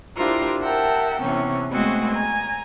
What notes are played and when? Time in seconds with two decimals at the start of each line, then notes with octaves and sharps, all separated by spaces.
0.16 D4 E4 F4 G4 A#4 C5
0.60 A#4 E5 F#5 G5 A5
1.21 C3 E3 B3 C#4
1.71 G#3 A3 B3 C4 F#4 G#4
2.09 G#5 A#5